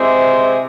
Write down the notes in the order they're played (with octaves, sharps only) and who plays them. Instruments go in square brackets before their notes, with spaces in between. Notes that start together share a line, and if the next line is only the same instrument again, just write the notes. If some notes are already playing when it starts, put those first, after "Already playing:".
Already playing: [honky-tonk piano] C3 [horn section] G#3 E4 G#4 C5